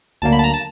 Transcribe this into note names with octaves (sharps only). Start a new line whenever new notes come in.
D2 D3 F#3 A#3 A5
B5
A5
A#5
A5